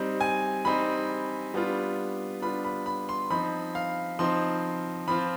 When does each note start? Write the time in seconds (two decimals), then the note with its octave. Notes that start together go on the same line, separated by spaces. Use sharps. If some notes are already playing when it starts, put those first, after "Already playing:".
Already playing: G3 C4 D#4
0.21 G#5
0.65 G3 C4 D#4 B5
1.54 G3 B3 D4 F4
2.42 G3 B3 D4 F4 B5
2.65 B5
2.86 B5
3.09 C6
3.30 F3 C4 D#4 B5
3.75 F5
4.19 F3 C4 D#4 C6
5.08 F3 C4 F4 B5